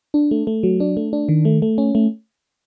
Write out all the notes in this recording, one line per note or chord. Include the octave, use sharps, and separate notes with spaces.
D4
A3
A3
F#3
D4
A3
D4
D#3
A3
A3
C#4
A3